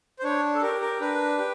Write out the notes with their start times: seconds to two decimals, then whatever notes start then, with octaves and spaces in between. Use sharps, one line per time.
0.19 C5
0.24 D4 C#5
0.55 A4
0.62 G4 A#4
0.81 A#4
1.01 D4 B4
1.38 G4